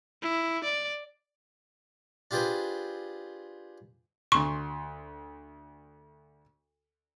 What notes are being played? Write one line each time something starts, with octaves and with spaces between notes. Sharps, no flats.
E4
D5
D4 F4 G4 G#4 B4 C5
D2 C6 C#6